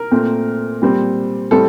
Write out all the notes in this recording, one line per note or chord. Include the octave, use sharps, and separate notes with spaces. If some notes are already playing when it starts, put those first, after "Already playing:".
Already playing: A#4
A#2 A3 C4
A#2 G3 C4
A2 G3 C4 A4